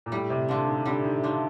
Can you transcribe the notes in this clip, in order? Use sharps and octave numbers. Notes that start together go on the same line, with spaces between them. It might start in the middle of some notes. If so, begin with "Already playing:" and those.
A#2
A2 G3
C3
D3 D4 F4
D#3
D3 G3
D#3
D#3 D4 F4